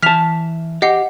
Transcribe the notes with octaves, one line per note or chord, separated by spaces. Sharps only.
E3 A5 F6 B6 F7
G4 D#5 F#5 C7